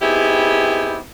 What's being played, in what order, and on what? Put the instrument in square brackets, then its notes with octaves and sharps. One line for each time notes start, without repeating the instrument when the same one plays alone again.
[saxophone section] B3 C4 D#4 E4 G4 G#4